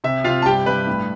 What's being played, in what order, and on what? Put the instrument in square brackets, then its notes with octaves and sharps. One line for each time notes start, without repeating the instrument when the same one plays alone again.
[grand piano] C3 E5
C3 F4 F5
A5
G2 G4 G5
G2 B4 B5
A2